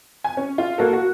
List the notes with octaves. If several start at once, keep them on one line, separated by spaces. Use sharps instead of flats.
G#5
C#4
F4
A#3 F#4 A4
F#4